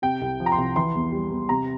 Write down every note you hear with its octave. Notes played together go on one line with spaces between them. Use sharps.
C3 G5
C2
F3
A#5
C6
C2
E3 C6
E2
G3
E2
C3 A#5